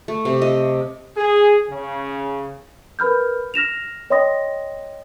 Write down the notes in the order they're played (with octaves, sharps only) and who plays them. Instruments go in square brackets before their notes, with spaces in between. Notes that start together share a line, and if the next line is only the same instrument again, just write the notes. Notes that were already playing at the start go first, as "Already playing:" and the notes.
[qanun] A3
C3
D#5
[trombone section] G#4
C#3
[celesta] A#4 B4 B5 F6 G6
F6 A#6 E7 F7
C#5 D#5 G5 C6 D#6 A#6